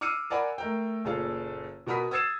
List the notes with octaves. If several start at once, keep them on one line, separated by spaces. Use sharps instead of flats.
D6 E6 F6 C7 C#7 D#7
A#4 D5 F#5 G#5 B5
A3 A#4 G5
F#1 A#2 G#4 A4 F5
B2 F#4 A#4 B5 D#6 B6
D#6 E6 G#6 A6 C7 E7